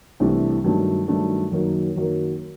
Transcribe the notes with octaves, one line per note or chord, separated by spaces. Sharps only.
C2 C3 E3 A3 D4
G2 D#3 F#3 A3 D4
G2 D#3 F#3 A3 D4
F#2 D#3 F#3 A#3
F#2 D#3 F#3 A#3